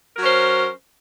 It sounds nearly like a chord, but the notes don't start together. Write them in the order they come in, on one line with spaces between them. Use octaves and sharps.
A#4 F#3 C#4 C5